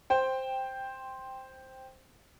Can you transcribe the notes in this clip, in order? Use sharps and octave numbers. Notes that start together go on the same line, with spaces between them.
C5 G5